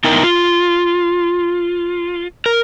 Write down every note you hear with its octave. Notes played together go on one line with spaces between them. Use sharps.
B3 D#4 E4 A#4 G5
F4
A#4